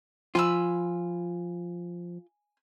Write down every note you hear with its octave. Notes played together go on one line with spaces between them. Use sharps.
F3 F4 G#5 B5 E6